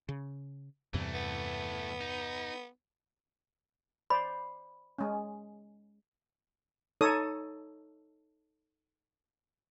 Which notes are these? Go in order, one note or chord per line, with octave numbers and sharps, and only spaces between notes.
C#3
E2 G2 C3 E3 A3
B3
D#4
C5 D5 B5
G#3 C#4
D#4 A4 C#5 D#6